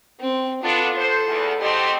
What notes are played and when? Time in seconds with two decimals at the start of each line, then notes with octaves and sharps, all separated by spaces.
0.20 C4
0.63 B3 D4 F4 A4
0.96 A4 C5
1.26 E2
1.61 A3 C4 G4 D#5 C6